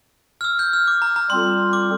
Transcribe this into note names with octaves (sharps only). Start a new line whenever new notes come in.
F6
E6
G6
F6
D6
A#5
A#5
G3 C4 F4 A4 C6
D6